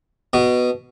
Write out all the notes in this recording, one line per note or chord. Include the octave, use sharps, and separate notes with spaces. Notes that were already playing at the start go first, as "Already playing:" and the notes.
B2